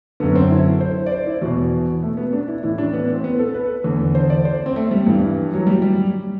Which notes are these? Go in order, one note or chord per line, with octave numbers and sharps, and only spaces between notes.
F#2 D3 B3
C4
E4
C5
D5
C5
E4
E2 B2 F#4
A3
B3
D4
E4
A2 E3 E4
D4
B3
C4
B3
A4
B4
E2 D3
C5
D5
C5
C4
A3
G3
G2 E3
F#3
G3
G3